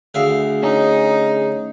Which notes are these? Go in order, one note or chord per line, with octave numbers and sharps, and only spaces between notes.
D2 G#4 E5 F5
C#4 D#4